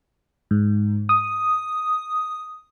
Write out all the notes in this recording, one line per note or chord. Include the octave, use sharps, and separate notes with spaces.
G#2
D#6